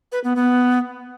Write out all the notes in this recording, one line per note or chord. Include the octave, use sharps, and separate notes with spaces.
B4
B3
B3